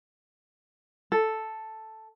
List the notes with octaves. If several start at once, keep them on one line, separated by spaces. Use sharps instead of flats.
A4